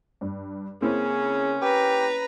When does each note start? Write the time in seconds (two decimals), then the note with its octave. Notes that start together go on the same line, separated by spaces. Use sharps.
0.21 G2
0.82 C#3 A#3 C4 C#4 E4
1.62 G4 B4 A#5